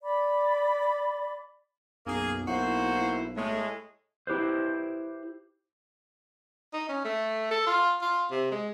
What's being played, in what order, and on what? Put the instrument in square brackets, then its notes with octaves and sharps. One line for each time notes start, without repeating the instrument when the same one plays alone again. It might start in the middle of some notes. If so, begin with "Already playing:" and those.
[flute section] D5 B5 D6
[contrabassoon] B1 [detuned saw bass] F#2 [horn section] A#3 G#4
[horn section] A#3 F#4 C5 [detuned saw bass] E4
[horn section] A2 G#3 [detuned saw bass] A3
[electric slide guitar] E4 G4 B4 C5
[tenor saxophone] D#4
C#4
A3
A4
F4
F4
C3
G#3